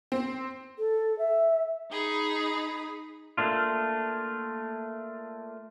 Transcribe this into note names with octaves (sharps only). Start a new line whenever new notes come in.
C4
A4
E5
D#4 G#4 B5
A3 A#3 D4 F4